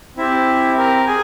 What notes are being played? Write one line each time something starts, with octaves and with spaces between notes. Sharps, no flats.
C4 E4 G4 E5
A#4
G#4 G#5